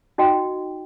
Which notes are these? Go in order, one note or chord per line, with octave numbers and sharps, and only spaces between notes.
D#4 F#4 D#5 G5